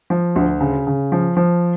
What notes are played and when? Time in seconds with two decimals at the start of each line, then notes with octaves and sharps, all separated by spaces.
0.10 F3
0.36 D2
0.61 C#3
0.87 C#3
1.12 F3
1.37 F3